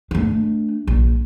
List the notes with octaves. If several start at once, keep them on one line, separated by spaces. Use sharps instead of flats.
A3 D4
A#1